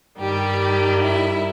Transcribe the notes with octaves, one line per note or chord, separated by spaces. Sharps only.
G2 D#3 G3 G4
E4